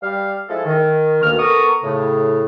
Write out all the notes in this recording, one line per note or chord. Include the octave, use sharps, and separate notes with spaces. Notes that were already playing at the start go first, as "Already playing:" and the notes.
G3 F5
F3 G#3 E4 A4
D#3
D2 B2 D#3 A#3 F6
B3 A4 A#4 A#5 C#6 D#6
A2 C#3